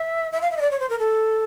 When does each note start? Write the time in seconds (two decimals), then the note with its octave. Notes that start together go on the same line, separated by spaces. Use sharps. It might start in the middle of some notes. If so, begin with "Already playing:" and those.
Already playing: E5
0.32 E5
0.42 F5
0.51 E5
0.57 D#5
0.61 D5
0.71 C#5
0.80 C5
0.89 A#4
0.99 A4